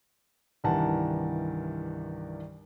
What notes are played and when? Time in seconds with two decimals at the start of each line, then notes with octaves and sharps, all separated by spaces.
0.64 C2 G2 D#3 E3 F#5 A5